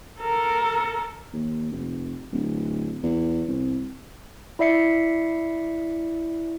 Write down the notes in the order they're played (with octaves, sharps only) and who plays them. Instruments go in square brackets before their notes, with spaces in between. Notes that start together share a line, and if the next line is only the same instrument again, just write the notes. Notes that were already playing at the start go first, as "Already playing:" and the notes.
[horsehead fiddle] A4 A#4
[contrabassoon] D#2
F1
D1
E2
C2
[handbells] E4 D5 E5 C7 C#7